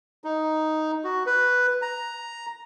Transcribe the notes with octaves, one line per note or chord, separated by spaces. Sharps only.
D#4
F#4
B4
A#5